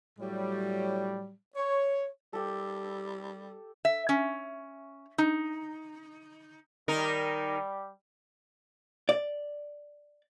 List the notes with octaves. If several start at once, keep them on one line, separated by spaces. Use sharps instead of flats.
A2 F#3 G3
C#5
G3 G4 A4
E5
C#4
D#4
D#3 G3 D#4 A#4
D5